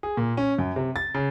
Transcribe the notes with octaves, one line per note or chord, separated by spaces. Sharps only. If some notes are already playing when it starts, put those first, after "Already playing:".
G#4
A#2
C#4
F#2
C3
A6
C#3